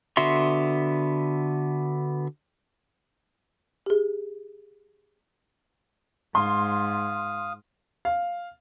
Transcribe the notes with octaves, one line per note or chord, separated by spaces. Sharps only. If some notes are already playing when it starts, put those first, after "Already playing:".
D3 B3 F#4 E5 C6
G4 G#4
G#2 F5 C6 D#6
F5